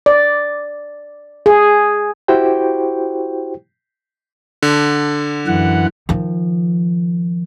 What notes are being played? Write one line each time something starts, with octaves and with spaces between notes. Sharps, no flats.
D5
G#4
E4 F#4 G4 C5 G5
D3
F#2 E3 F#5
D#3 F3